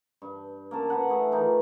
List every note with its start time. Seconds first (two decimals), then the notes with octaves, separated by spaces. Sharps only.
0.22 G2
0.71 A#3 C#4 A5
0.90 D4 B4 F#5
1.09 A3 E4 G#4
1.31 D#3 E3 D#4 F4